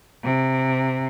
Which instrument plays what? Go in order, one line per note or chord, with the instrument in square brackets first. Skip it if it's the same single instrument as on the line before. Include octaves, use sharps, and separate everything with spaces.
[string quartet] C3